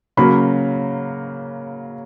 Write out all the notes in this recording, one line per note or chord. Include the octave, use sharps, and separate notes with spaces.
C#3 F#3 A#3 B5